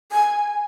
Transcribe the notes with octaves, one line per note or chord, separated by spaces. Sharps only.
G#5